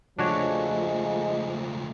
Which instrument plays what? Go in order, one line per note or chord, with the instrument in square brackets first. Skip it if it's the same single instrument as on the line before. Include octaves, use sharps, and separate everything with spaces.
[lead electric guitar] C#2 A3 [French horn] F3 [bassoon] G#3 [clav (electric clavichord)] D4 F#4 C#5